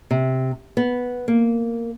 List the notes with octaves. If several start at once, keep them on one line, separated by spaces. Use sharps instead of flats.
C3
B3
A#3